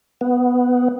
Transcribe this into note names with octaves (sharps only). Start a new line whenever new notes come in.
B3